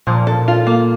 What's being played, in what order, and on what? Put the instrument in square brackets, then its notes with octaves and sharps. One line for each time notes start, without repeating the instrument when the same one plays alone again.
[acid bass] A#2 [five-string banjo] F3
[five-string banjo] A4
F4
A#3